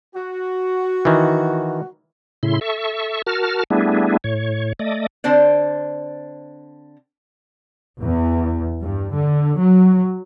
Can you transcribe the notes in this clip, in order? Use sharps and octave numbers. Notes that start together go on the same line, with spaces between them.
F#4
D#3 E3
A2 C#3 E4 C6
A4 E5 C#6
F#4 A#4 A5 F6
G3 A3 B3 D4 E4 G#4
A2 C#5
A3 D5 D#5
D3 C4 D4 C5 D5
E2
G2
D3
F#3